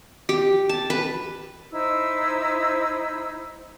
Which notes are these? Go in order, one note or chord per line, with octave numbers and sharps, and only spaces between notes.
G4
A5
B4
D#4 E4 C5 E6